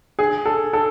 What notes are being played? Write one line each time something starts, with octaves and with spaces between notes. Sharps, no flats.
G#4
A4
A4